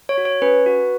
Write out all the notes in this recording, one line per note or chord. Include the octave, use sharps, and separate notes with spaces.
C#5
F#4
C#5
C#4 B4
F#4